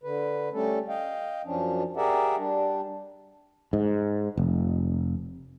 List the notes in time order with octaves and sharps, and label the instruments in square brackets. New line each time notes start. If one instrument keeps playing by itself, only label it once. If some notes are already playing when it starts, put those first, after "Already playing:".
[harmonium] D3 B4
G3 A3 C#4 A4
D#5 F5 G5
F#2 F3 C#4 D4
G4 G#4 A#4 D5 E5 F#5
G3 D4
[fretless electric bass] G#2
F1